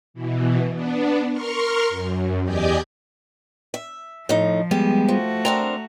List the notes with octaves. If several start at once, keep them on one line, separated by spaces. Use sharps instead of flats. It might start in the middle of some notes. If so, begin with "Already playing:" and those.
B2 E3
B3 D4
A#4 C6 C#6 F6
F#2
E2 G4 D5 D#5 G#5 G6
E5
A2 F3 D#4
G3 G#3 B3 G4
F3 A3 F#4
C4 D4 A#4 A#5